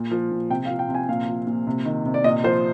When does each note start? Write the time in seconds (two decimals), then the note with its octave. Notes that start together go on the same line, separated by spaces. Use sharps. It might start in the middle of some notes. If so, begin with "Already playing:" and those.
Already playing: A#2
0.11 F3
0.32 A#2
0.50 C3 G5
0.65 F5
0.70 F3
0.79 G5
0.89 C3
0.95 G#5
1.09 A#2 F5
1.28 F3
1.47 A#2
1.67 C3
1.85 D#3
2.06 C3
2.14 D5
2.24 A#2 D#5
2.44 F3 C5